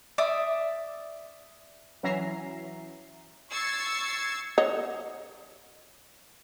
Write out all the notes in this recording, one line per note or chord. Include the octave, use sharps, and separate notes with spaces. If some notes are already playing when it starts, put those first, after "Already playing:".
D5 E5 D6 D#6
E3 F#3 C#4 E5 A#5 C7
C#6 E6 G#6 A6 C7 C#7
C#5 D#5 F#5